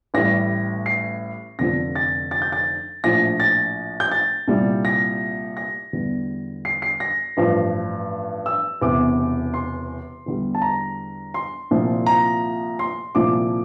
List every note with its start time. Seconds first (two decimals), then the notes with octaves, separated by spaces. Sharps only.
0.14 A1 A2 G3 A#6
0.86 C7
1.59 F1 F2 D3 F3 A#6
1.95 A6
2.31 A6
2.42 G6
2.52 A6
3.04 A#1 A2 F3 A#6
3.40 A6
4.00 G6
4.12 A6
4.47 C2 A#2 G3
4.85 A#6
5.57 A#6
5.93 E2 D3 G3
6.65 C7
6.82 C7
7.00 A#6
7.37 A1 G2 F3
8.46 E6
8.81 E1 E2 C3 D6
9.54 C6
10.26 E2 D3 G3
10.55 A5
10.62 A#5
11.34 C6
11.71 C2 A#2 F3
12.06 A#5
12.79 C6
13.15 C2 A#2 F3 D6